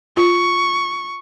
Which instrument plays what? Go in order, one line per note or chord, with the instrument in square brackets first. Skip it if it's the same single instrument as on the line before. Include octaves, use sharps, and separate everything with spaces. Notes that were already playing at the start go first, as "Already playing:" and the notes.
[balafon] F4 [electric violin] C#6